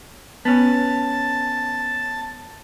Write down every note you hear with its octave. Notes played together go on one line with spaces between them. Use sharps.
B3 C#4 A5